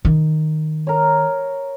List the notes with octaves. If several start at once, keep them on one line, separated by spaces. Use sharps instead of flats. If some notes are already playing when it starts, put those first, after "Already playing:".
D#3
A#4 C#5